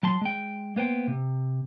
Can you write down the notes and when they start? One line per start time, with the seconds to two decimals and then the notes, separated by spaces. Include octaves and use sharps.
0.03 F#3 A5 C6
0.22 G#3 G5
0.76 A#3 B3 C5 G5
1.08 C3